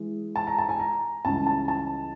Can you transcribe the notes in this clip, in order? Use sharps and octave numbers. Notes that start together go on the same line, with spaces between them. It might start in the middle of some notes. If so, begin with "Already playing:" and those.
Already playing: E3 G#3
A5
A#5
A5
G#5
A#5
C#2 C#3 E3 G3 A5
A5
A5